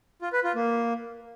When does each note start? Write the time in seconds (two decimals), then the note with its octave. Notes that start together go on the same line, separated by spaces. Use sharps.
0.22 F4
0.33 B4
0.44 F4
0.55 A#3